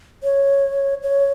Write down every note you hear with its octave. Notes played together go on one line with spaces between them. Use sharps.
C#5
C#5